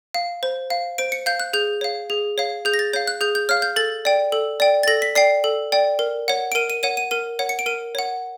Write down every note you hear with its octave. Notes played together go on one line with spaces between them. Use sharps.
F5
C5
F5
C5 D7
C#7
F5 G6
F#6
G#4 G6
C#5 F5
G#4
C#5 F5
G#4 G6
A#6
A6
C#5 F5 G6
F#6
G#4 G6
G6
C#5 F5 F6
G6
A4 A6
D5 G5
A4
D5 G5
A6
A4 A#6
B6
D5 G5 C7
A4
D5 G5
A#4
C#5 F#5
D7
A#4 D#7
D#7
C#5 F#5 D#7
D#7
A#4 D#7
C#5 F#5
C#7
D7
A#4 D#7
C#5 F#5